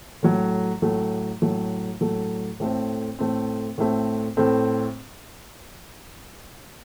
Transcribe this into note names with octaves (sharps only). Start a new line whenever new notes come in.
A2 F#3 A3
A2 F#3 A3
A2 F#3 A3
A2 F#3 A3
A2 A3 C4
A2 A3 C4
A2 A3 C4
A2 A3 C4